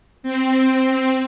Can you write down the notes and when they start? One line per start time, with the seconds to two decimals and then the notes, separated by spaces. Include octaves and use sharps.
0.23 C4